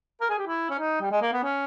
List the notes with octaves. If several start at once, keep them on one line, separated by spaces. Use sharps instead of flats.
A#4
G#4
G4
E4
C#4
D#4
G3
G#3
A#3
B3
C#4